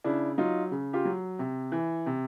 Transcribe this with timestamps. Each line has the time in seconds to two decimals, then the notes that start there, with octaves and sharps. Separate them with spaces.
0.04 C#3 D4 E4
0.38 F#3 D#4 F4
0.71 C#3
0.93 F4 G4
1.05 F#3
1.39 C3
1.72 E3
2.06 C3